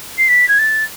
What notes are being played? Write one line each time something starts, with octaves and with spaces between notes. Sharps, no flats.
C7
B6
G#6
A6